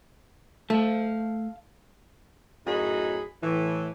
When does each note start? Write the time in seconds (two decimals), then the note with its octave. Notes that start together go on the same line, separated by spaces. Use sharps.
0.70 A3 F5 A5
2.67 F#2 A2 D#4 F#4 G#4 B5
3.43 A2 E3